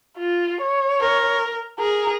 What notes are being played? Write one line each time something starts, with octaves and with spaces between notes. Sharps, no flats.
F4
C#5
A#4
G#4 A#4